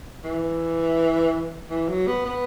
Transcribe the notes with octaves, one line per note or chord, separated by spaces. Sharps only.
E3
E3
F#3
B3
B3